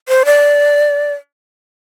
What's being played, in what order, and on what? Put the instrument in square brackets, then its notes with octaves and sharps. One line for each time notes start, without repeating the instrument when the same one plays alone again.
[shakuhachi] C5
D5